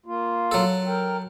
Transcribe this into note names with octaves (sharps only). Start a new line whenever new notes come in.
A#3 F4
F#3 A4
A#4 G5